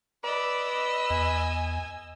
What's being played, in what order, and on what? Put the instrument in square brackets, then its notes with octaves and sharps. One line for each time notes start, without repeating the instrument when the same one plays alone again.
[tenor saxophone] B4 [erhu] D5 [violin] D#5 E6
[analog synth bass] E2 [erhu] G#5